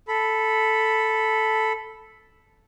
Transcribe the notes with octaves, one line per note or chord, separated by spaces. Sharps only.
A4 B5